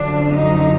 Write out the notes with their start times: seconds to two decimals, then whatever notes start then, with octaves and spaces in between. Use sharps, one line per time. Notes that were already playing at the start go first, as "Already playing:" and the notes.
Already playing: F#2 D3 F3 D4
0.35 D#4